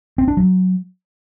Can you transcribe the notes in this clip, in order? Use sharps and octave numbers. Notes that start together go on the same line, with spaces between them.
C4
D4
F#3